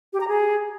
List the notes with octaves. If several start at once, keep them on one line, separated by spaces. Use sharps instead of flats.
G4
A#5
G#4